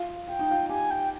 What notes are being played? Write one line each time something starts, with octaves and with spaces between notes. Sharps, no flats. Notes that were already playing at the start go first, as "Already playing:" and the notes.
Already playing: F4
F4 G5
D#4
F4
G4 G#5
G5